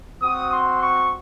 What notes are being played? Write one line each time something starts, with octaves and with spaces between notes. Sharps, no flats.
C4 F#4 D#6
C6
C#6